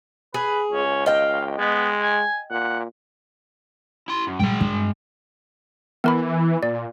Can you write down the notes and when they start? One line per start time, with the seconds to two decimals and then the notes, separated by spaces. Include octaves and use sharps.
0.34 G#4 B4
0.72 C#2 C#4
1.06 D#5 F5 G5
1.58 G#3 B3
2.01 G#5
2.51 A#2 F#5
4.08 E4 C6
4.27 F#2
4.39 A#2 G3 G#3 G5
4.61 G2
6.04 E3 B3 A#4 B5
6.63 A#2 D5